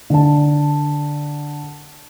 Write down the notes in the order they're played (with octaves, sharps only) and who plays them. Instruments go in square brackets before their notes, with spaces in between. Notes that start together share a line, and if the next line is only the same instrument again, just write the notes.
[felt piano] D3 A5